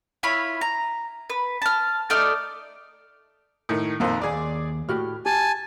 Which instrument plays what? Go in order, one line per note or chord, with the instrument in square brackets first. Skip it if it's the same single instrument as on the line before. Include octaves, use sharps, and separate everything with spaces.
[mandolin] E4 F4 C#5 B5
A#5
B4
A5 F6
A3 D#4 D5 F6
[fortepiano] A2 D#3
[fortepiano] A#1 F2 D#3 [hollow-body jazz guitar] A#3 C5 G#5
[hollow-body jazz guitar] D#2 [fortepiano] G#4 D5
[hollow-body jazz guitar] A2 F#4 G4 [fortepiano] F6
[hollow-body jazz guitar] G4 [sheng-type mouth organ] G#5 A5